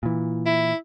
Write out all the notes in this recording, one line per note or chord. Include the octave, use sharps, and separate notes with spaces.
A#2 E3
E4